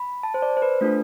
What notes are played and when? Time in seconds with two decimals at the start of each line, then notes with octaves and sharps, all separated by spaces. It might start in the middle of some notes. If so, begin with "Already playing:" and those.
Already playing: B5
0.23 A5
0.34 C5
0.42 D5
0.57 C5
0.62 B4
0.81 A3 D4 F4 A4